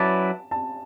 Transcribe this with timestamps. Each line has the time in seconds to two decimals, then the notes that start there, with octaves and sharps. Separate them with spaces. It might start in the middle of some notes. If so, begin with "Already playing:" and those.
Already playing: F#3 C#4 E4 B4 D5 A5
0.51 A5